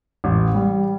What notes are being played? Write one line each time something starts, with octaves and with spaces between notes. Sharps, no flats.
A1
G3